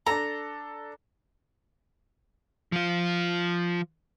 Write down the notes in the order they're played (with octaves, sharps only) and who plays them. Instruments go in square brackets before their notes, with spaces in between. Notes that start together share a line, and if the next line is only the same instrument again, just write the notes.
[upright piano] D4 A4 [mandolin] A#5
[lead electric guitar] F3 F4